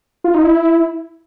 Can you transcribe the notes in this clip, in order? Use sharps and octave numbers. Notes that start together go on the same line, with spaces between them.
F4
D#4
E4